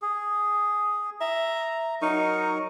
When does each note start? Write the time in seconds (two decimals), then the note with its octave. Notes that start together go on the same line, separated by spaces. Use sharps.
0.02 G#4
1.20 E5 A#5
2.02 F#3 D#4 A#4 C#6